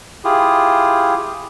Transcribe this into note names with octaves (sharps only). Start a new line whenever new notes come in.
E4 F4 G4 G#4